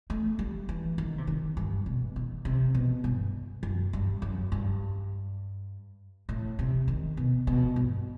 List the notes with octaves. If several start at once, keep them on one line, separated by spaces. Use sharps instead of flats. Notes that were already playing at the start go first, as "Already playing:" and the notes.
A3
G3
E3
D#3
C3
D#3
G2
B2
D#3
C3
B2
G2
F#2
G2
F#2
G2
A2
C3
D#3
B2
B2
G2